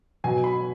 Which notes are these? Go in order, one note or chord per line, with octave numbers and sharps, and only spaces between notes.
B2 F#3 B3 G#5
B5